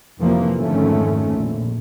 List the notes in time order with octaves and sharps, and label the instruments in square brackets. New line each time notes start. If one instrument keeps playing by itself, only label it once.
[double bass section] F1 E3 F3 A#3
G#1 F2 D3 D#3 A3 C#4
A#1